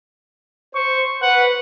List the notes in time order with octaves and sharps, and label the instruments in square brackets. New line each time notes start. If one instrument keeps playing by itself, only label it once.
[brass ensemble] C5 [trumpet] C#6
[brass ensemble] B4 [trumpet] F#5